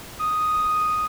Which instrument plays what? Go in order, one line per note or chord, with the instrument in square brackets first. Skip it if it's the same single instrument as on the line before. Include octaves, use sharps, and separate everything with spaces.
[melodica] D#6